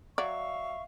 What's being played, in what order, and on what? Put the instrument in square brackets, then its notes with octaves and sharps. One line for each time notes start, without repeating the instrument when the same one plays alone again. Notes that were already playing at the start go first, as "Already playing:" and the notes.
[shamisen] F#3 D5 [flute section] E5 F5 C#6